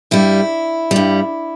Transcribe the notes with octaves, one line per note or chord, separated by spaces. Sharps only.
G2 G3 E4
G2 G3